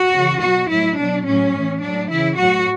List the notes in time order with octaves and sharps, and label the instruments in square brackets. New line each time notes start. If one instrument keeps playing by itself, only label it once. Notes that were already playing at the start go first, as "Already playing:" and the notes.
Already playing: [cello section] F#4
C#3 E3
B2 F#3 F#4
A2 F#3 E4
B2 F#3 D4
A2 F#3 C#4
A2 E3
A2 F#3 D4
C#3 E3 E4
A2 F#3 F#4